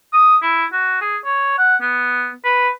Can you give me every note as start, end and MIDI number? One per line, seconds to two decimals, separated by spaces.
0.13 0.37 87
0.42 0.65 64
0.72 1.00 66
1.01 1.17 68
1.25 1.57 73
1.58 1.76 78
1.81 2.32 59
2.44 2.69 71